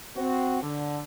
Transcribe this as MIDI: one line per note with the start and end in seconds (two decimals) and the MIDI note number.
0.17 0.62 60
0.17 0.62 66
0.62 1.01 50